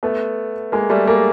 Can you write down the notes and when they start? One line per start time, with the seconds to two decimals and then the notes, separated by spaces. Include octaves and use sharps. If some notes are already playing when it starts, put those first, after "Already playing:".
0.03 A3 B3
0.72 G#3 A#3
0.90 G3 A3
1.07 G#3 A#3